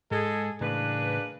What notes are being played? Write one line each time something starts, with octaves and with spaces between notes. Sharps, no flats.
G#2 G#3 G#4 A4
A2 C#3 E3 G#3 A#3 D4 B4